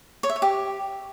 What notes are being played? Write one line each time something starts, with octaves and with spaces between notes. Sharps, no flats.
C#5
E5
C#5
G4